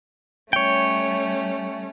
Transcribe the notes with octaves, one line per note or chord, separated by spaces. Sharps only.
G3 A3 C#4 C#5 G5